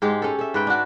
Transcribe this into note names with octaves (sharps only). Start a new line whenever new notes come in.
G#2 G#3 G4
C#4 A4
A4 E5
G#2 B4 G5
D4 F#4